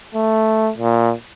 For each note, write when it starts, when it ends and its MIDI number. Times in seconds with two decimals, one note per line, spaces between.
0.15 0.71 57
0.77 1.13 46